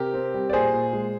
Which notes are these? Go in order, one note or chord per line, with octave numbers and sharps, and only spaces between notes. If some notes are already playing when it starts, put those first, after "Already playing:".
Already playing: C3 G4 A#4
C4
G3
D5
A#2 G#4 C5
A#2
G#3